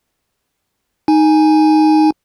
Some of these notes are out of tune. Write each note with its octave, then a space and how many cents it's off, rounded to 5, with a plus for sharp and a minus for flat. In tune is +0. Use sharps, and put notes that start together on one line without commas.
D#4 +0 G#5 +0